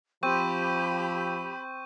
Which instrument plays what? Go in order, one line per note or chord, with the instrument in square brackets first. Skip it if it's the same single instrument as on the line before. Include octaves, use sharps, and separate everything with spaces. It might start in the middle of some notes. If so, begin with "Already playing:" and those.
[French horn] F3 [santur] C4 [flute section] G4 B5 [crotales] C#6 G6 D#7